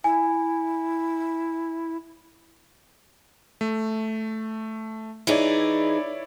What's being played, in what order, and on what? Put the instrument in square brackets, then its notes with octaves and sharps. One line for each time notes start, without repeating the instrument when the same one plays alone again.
[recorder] E4 [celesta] G#5
[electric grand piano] A3
[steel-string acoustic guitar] E3 D#4 G#4 [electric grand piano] E4 C#5 D5